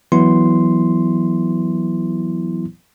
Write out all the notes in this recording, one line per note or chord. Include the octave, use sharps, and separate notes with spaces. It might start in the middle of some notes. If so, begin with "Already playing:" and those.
E3 F#3 B3 E4 C6